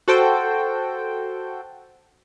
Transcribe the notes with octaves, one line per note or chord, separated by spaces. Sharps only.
F#4 A4 C5 G5